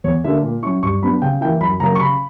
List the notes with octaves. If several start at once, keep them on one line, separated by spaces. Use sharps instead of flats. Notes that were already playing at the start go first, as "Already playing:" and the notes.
E2 C#5
D3 A#3 D4 E5
A#2
F#3 C#4 E4 C#6
G2 C#6
F#3 B3 D4 B5
C#3 G5
E3 A#3 E4 G5
F#2 B5
C#3 F#3 A#3 A#5
C#6
C#3 B5